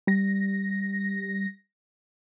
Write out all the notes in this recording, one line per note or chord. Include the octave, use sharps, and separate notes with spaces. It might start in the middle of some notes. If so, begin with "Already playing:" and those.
G3 A#6